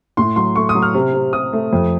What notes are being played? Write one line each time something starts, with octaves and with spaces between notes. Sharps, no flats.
A2 C6
F#3 C6
A3 C#6
D#6
F#3
F6
C3
C3
C3 D#6
A3
F2